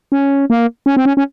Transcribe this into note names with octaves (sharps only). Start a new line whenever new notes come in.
C#4
A#3
C#4
C4
C#4
C#4